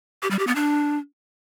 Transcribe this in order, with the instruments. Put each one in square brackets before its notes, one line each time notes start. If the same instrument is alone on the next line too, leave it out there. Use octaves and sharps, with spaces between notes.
[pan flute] G4
G3
G4
B3
D4